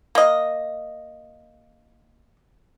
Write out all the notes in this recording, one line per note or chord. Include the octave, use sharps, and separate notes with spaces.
A#3 D#5